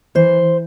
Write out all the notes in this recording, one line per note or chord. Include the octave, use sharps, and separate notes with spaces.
E3 C5